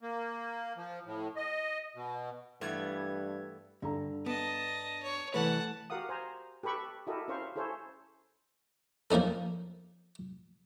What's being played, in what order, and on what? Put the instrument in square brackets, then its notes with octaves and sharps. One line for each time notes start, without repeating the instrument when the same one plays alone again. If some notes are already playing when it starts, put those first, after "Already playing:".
[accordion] A#3
F3
A2
D#5
B2
[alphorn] G2 [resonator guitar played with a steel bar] E3 A3 B3 [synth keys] G3 G#6
[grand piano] G2 A4 A#5 [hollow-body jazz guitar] D3
[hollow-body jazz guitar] B3 [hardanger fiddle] D#5 A5
[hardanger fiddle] C#5
[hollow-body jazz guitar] C2 E3 B4 [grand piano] A3 [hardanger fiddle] F#5 A5
[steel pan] F#4 G4 A#4 F5 F#5 D#6
C5 G#5 A#5
G4 A4 B4 B5 C#6
E4 F#4 G4 A4 A#4 D#5
C#4 E4 A#4 C5 F5 C#6
E4 G#4 A4 C5 C#5
[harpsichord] F3 A#3 C#4 D#4 A4